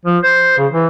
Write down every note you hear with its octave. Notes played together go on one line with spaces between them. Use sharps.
F3
C5
C#3
E3